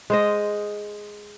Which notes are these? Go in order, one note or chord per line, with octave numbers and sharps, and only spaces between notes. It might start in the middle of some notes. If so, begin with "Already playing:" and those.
G#3 C5 D#5